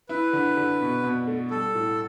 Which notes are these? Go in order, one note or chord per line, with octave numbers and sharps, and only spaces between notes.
E4 B4
D3
D3
B2
B2
A3
G3 A4
A2